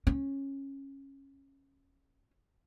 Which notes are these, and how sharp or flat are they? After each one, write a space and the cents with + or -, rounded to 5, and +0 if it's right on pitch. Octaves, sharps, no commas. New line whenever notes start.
C#4 -15